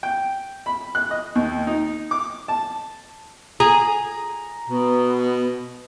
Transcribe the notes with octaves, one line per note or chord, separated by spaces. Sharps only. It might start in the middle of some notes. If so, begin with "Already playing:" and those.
G5
B5
F#6
D#5
D#2
D#4
D6
A5
G#4 A#5
B2 B3